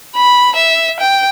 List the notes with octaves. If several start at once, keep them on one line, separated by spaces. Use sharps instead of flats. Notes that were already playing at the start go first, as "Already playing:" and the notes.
B5
E5
G5